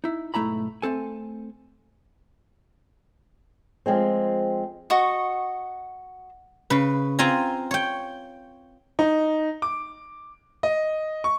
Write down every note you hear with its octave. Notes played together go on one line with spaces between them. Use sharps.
D#4 E4
B1 G#2 A3 E4 A#5 B5
A3 C4 A4 G#5
F3 G#3 C4
F#4 D#5 C#6
C#3 B4
C4 F4 G#5 A#5
C#5 G5
D#4
D6
D#5
C#6